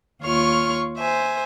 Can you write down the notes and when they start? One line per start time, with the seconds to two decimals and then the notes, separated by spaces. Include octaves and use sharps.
0.22 D#2 F4 C#5 C#6 F6
0.98 C5 E5 G#5